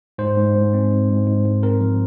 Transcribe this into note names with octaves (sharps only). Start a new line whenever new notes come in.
G#2 C5
G#2
G#2
C4
G#2
G#2
G#2
G#2
C4 A#4
F3